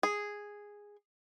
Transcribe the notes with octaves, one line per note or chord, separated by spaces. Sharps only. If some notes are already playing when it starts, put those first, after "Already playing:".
G#4